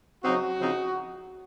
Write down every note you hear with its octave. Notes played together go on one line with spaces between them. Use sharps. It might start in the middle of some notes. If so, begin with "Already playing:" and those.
C#3 F#3 C4 D#4 F#4
C#3 F3 C4 D#4